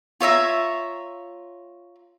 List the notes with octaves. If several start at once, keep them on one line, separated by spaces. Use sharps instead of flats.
F4 C#5 E5 A#5